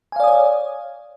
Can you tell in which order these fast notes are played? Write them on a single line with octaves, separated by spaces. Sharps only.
G#5 F5 D5 D#6 C#5